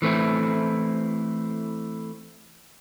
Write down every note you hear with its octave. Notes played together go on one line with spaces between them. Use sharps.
E3 A3 C4 E4